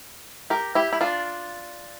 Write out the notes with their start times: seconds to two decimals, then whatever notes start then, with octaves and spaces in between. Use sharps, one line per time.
0.50 G4 A#4
0.75 E4 G4
0.93 E4
1.01 D4 F4